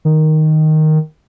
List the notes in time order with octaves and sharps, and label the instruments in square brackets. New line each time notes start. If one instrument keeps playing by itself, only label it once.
[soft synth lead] D#3